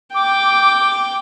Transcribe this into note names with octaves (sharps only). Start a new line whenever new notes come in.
G5 D6